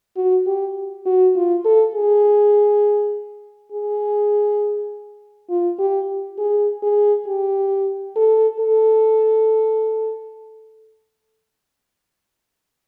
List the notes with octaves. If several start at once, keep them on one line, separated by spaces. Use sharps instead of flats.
F#4
G4
F#4
F4
A4
G#4
G#4
F4
G4
G#4
G#4
G4
A4
A4